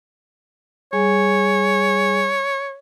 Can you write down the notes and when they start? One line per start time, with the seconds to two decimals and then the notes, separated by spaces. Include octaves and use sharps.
0.93 G3 G#4 C#5 G#5